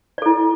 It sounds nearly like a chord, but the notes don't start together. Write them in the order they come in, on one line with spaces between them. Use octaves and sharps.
D5 A4 E4